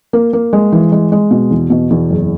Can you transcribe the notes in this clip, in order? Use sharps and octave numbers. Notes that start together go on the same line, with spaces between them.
A#3
A#3
G#3
E3
G#3
G#3
B2
E2
B2
E2
F#1